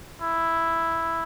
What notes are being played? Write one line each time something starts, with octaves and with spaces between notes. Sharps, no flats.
E4